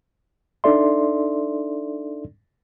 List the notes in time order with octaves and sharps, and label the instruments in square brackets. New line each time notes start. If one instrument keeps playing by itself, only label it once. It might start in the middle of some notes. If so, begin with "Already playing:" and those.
[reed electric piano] D4 D#4 A4 D5 E5 C6